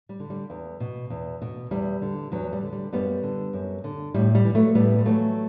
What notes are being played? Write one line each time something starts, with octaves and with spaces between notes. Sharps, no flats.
G3
D3
G3
E2
B2
E2
B2
E2 G3
D3
E2 F#3
G3
D3
G3
F#2 G3 B3
D3
F#2
D3
A2 G3
G3
E3
F#3 A3
A2 G3 B3
G3
E3 F#3 A3